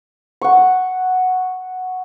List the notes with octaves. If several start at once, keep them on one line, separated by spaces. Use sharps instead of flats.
F#5 C#6